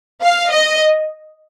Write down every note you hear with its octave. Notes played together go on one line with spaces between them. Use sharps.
F5
D#5